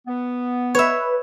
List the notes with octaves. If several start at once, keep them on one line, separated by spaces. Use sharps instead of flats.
B3
B4 C#5 E5